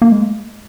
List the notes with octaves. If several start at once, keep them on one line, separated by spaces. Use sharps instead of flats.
A#3
G#3